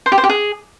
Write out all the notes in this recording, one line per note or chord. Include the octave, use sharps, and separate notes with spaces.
C5
G4
C5
G4
G#4